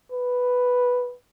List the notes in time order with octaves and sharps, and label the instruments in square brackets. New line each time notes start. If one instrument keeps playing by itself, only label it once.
[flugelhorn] B4